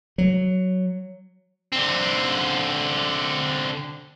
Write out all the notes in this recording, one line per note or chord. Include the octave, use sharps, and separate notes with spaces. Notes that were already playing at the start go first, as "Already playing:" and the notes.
F#3
D3 C4